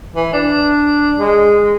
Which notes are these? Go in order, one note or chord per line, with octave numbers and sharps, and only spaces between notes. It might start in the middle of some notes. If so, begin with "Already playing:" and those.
E3
D4
G#3